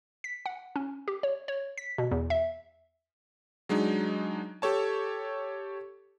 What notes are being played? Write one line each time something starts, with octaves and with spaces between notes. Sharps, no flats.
B6
F#5
C#4
G4
C#5
C#5
B6
B2
E2
E5
F#3 G#3 D4 D#4
G4 A4 C#5 A5